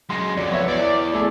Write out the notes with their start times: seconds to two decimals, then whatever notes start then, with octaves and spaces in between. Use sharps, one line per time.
0.10 F#2 G#3 C6 A#6
0.37 F2 F#3 D5
0.52 B3 C#5 E5
0.68 E2 D5
1.14 A3 E4 G#4